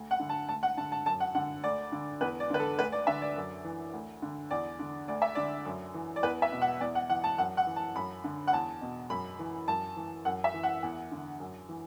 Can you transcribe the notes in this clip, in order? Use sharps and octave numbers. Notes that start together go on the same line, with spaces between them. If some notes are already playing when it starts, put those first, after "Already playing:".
Already playing: D2
F#5
D3
A5
D2 A5
F#5
D3 A5
A5
F#2 A5
F#5
D3 F#5
D2 D5
D3
E2 B4
D5
D3 B4
A4
D2 B4
D5
D3 E5
D5
F#2
E3
D2
D3
E2 D5
D3
D2 D5
E5
D3 D5
F#2
E3
D5
E2 B4
E5
B2
F#5
E2 D5
F#5
E3 F#5
A5
F#2 F#5
F#5
E3
A5
F#2 B5
D3
F#5
E2 A5
B2
F#2 B5
E3
F#2 A5
E3
F#2 F#5
E5
E3
F#5
E2
D3
F#2
E3